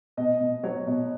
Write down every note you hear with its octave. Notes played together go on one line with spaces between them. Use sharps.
B2 D#5
B2
F#3 C#5
B2